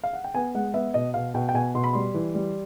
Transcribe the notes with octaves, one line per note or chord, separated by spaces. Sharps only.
F5
F#5
G5
B3 G#5
G#3 F#5
B3 E5
B2 D#5
B2 F5
B2 G5
G5
B2 G#5
B2 C6
B5
G3 C6
E3
G3